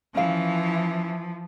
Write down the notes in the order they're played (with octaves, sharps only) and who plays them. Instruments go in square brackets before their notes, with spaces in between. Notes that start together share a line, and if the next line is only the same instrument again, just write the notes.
[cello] E3 [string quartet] F3 [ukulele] C#4 F5